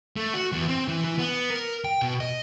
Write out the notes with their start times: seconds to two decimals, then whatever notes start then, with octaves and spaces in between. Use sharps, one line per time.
0.16 A3
0.34 F#4
0.52 E2
0.68 C4
0.88 E3
1.05 E3
1.19 B3
1.50 A#4
1.84 G5
2.02 B2
2.20 D#5